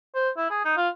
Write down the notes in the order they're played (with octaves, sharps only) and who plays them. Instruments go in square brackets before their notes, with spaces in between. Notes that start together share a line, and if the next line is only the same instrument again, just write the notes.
[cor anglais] C5
E4
G#4
D#4
F4